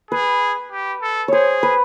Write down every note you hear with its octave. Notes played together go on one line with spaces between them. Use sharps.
G#4 B4
G4
A4
G#4 C5 C#5
B4